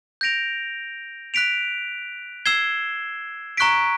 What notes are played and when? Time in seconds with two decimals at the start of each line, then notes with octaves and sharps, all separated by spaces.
0.21 G6 A#6 D7 F7
1.34 F#6 B6 D7 F7
2.46 E6 G#6 C7 E7 G7
3.57 A#5 C#6 F#6 B6 D7